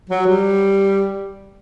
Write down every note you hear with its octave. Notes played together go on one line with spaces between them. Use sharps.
F#3
G3